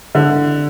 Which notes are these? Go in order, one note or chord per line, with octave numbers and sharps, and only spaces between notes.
D3